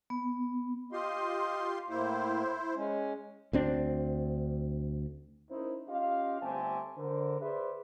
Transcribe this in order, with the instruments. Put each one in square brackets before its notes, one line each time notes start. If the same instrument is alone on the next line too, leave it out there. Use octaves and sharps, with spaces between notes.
[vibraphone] B3
[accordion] F4 G4 C6 [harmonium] D#5
[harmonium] A2 A#3 [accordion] E4 C5
[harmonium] G#3 C#4
[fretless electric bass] D2 C4 D4
[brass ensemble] C#4 D#4 E4 A#4 C5
C#4 F4 G4 D#5 F5
G1 A3 C4 G4 G#5 A5
D3 A#4 C5
G#4 B4 C5 D5 E5